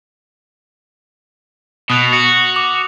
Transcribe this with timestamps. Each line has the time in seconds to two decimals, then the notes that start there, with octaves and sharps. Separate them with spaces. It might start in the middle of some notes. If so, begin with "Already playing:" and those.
1.90 B2 D#6 F#6 F7
2.13 F#4
2.56 D6